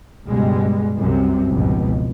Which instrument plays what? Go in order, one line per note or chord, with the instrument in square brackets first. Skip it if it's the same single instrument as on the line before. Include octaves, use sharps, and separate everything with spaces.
[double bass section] C#2 G2 B2 G3 G#3
C2 F#2 C3
F1 C#2 G#2 B2 E3